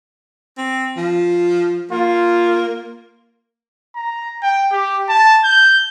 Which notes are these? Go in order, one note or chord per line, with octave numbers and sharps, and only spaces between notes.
C4
F3
A#3 F4
A#5
G5
G4
A5
G6